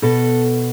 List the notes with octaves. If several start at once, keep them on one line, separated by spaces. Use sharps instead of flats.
B2 A4